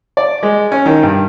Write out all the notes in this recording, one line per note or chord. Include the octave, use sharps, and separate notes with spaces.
D5
G#3
C#4
D#3
G2